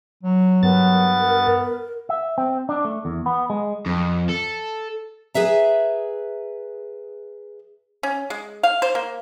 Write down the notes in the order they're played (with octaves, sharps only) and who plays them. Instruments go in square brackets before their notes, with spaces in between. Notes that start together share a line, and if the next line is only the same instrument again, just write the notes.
[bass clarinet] F#3
[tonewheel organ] G2 A6 [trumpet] B3 [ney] A#4
[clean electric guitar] E5
C4
D4
A3
E2
B3
G#3
[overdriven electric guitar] F2
A4
[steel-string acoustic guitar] G#4 B4 E5 A#5
[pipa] C#4
G#3
F5
C5
A#3